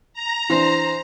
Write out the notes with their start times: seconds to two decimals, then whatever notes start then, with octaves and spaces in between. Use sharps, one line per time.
0.14 A#5
0.50 E3 D4 C5